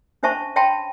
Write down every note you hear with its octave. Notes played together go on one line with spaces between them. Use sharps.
C#4 D4 C5 E5 A5 C#6
C#5 E5 G5 A5 B5 C6